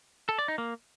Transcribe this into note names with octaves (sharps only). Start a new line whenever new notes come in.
A4
D5
D#4
A#3